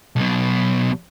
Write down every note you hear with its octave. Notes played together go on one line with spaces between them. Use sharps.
B1 B2